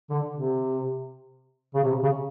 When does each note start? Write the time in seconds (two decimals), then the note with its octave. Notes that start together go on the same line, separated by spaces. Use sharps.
0.10 D3
0.34 C3
1.75 C#3
1.84 C3
2.03 C#3